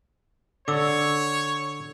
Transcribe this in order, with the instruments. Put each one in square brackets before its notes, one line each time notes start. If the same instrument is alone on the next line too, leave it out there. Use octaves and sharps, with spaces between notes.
[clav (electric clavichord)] D3 [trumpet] C#5 [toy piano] D6 E6